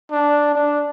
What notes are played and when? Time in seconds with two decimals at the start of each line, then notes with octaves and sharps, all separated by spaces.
0.11 D4
0.55 D4